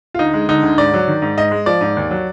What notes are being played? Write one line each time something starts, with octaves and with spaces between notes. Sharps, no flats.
F4
D2 D#4
G#3
D3 D#4
D2
G#2 D5
F#3
D#3
G#2
G#2 D#5
G#3
F3 D5
G#2
D#2
F#3